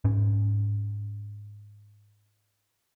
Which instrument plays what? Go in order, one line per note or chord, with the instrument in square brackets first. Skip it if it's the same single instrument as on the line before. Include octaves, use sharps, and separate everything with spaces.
[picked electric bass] G#2 C#4